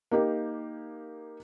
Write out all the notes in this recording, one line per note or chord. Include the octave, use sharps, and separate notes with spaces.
A#3 D#4 G4 A#4